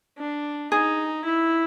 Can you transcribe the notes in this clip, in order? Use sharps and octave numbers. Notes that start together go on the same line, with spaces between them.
D4
D#4 G#4
E4